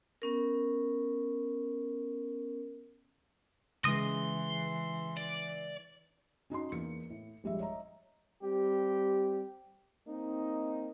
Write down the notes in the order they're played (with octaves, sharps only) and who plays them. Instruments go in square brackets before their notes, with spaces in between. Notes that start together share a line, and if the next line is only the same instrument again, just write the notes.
[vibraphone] B3 C#4 A#4
[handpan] C#3 G#3 [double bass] E3 [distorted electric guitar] C6 [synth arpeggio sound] D#6 A#6
[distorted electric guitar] D5
[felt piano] C#4 D#4 F#4 C6
E2 A#3 C#7
A2
A#1 G3 G#3 E5
C#5 D#5 E5 A#5
[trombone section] G3 C4 G4
A#3 C4 D#4